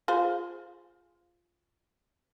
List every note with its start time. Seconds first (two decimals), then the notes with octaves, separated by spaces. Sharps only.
0.08 F4 G#4 C5